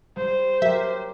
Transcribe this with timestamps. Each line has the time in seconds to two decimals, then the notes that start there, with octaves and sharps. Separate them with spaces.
0.17 G3 C5
0.62 F#3 G4 A#4 E5